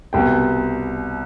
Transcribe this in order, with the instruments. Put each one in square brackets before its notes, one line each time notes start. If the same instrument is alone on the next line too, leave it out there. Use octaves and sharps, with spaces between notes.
[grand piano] C2 B2 G5